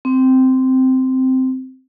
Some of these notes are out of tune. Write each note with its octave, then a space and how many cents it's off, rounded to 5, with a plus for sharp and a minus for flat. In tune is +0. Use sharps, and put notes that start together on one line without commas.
C4 -10